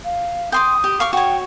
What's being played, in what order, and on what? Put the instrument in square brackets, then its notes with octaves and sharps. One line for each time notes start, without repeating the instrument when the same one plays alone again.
[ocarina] F5
[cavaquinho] G5 C6 D6 [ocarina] D#6
[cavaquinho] G4
F5 C#6 D6
[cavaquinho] F#4 C#5 [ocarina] G5